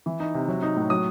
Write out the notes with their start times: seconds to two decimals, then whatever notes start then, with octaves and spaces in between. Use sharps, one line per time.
0.06 E3
0.20 D#4
0.34 C3
0.48 F#3
0.63 D#4
0.76 A2
0.90 F#3 D#6